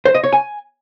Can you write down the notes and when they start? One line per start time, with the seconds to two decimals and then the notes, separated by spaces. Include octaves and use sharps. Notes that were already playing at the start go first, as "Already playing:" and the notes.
0.05 C5
0.15 D#5
0.24 C#5
0.33 G#5